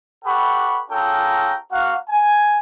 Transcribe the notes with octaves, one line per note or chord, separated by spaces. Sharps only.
G4 A4 B4 F#5 B5 C#6
C#4 F4 G#4 A4 G5 A#5
A#3 F#4 F5 F#5
G#5